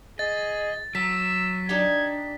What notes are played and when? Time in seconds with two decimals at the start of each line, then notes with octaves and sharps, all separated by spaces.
0.19 G#4 D#5 A6
0.95 F#3 A5 A#5 E6 B6
1.69 D4 D#4 G4 G#6